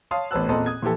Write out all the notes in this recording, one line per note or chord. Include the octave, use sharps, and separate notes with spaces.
C#5 F5 A5 C6 D#6
A1 B3 C5 A5 E6 F#6
E2 A#2 C4 A4 D#5 A#5
D#6 G#6
A#2 E3 F3 G4 A4